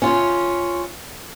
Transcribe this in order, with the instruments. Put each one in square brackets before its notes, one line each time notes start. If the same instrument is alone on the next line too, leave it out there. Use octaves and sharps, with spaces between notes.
[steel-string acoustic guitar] C#4 F4